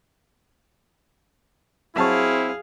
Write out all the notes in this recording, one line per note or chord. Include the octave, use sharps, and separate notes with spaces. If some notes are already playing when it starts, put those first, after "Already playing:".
F#3 C4 E4 G#4 F5 A5 C#6